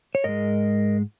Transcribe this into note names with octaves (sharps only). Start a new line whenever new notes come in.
C#5
G#2 G#3 A#4 D#5